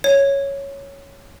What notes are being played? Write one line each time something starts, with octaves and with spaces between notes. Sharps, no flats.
C#5